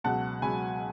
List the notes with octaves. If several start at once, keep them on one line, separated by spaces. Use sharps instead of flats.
C#2 B2 F#3 F#5 A5
C#2 B2 F#3 G#5 B5